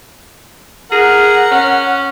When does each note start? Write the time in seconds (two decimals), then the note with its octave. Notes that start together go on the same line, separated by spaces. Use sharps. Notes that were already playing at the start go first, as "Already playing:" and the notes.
0.92 G#4 A#4 F#5
1.52 C#4